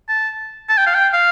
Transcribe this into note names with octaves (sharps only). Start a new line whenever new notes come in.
A5
A5
G5
F5
G5
F5